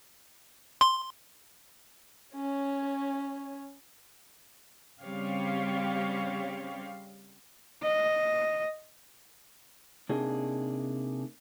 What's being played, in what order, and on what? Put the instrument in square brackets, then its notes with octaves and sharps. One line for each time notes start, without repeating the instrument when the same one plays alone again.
[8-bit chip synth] C6
[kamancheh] C#4 C#5
[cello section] C#3 G3 C4 G4 C#5 F5
[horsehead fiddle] D#5
[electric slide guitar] C3 A#3 D4 D#4 G#4